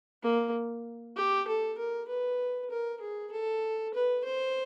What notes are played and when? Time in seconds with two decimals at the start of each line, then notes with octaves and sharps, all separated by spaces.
0.23 A#3
1.17 G4
1.47 A4
1.78 A#4
2.08 B4
2.70 A#4
3.00 G#4
3.32 A4
3.94 B4
4.24 C5